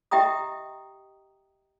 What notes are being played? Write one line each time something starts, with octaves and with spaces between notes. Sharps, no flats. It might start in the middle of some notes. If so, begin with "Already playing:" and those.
G4 D#5 E5 G5 A#5 D#6